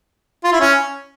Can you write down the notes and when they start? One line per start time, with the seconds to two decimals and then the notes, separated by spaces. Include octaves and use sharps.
0.44 F4
0.52 E4
0.61 C#4